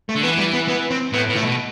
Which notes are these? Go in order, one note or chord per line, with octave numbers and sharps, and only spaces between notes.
A3
D3
E3 B3
G3
B3
B3
C4
A2 B3
A2
A3
B2